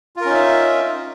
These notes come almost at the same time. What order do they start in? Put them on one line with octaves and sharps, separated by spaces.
F4 A#4 C#4 D#4 E5